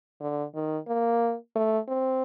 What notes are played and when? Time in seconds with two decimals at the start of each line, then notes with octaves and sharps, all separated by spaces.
0.21 D3
0.55 D#3
0.88 A#3
1.56 A3
1.88 C4